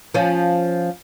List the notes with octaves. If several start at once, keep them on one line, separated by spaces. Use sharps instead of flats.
F3 C#4